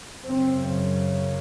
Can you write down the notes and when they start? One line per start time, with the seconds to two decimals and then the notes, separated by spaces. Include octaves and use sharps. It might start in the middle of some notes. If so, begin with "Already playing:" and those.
0.25 F#2 C#3 C4